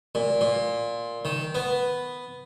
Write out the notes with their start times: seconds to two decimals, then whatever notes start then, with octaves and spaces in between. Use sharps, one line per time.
0.15 A#2
0.41 A#2
1.25 D#3
1.55 B3